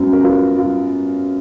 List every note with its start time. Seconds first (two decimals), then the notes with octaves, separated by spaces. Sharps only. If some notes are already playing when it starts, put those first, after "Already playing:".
Already playing: F#2 B3
0.13 A#4
0.23 F4 B4
0.58 F4